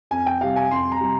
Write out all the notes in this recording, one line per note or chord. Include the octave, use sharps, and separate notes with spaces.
F2 G#5
G5
C3 G3 F5
G#5
F2 C6
A#5
C3 G3